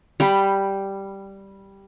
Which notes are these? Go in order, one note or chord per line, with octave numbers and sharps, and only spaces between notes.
G3 G5 B5